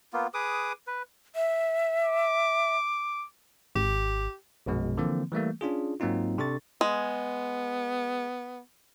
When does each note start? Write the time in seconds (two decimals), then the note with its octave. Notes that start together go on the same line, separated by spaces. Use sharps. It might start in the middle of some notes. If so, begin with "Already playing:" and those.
0.13 A#3 B3 F4
0.34 G#4 B4 D6 D#6
0.87 B4
1.36 E5
2.03 D6
3.75 G#1 G4
4.66 A#1 F#2 B2 G#3
4.97 D3 E3 F3 A#3 C4
5.32 E3 G3 A3 A#3
5.61 C#4 D4 F4 G#4
6.00 G#2 F#3 A#3 C4 D#4 F4
6.38 C3 D4 A4 C#6 A6
6.81 G#3 B3